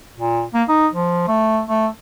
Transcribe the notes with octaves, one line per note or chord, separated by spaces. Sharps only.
A#2
A#3
D#4
F3
A3
A3